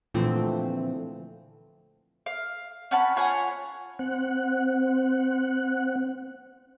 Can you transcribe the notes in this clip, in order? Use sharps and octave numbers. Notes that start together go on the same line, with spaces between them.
A#2 D3 E3 F3 A3 C4
F5
C#4 F#5 A5 B5
F4 C#5 F#5 G#5
C4 F#5